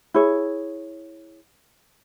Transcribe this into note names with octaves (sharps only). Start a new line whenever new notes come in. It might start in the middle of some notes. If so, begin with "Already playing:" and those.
E4 G#4 C#5